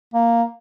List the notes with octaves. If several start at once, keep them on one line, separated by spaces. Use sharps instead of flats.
A#3